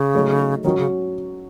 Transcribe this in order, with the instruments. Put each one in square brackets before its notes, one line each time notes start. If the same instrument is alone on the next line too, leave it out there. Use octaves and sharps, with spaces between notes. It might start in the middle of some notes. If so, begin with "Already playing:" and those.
Already playing: [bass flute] C#3
[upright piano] F#3 A3 D#4 G#4 C#5
[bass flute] D#3 [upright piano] F#3 C#4 F#4
[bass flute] C#3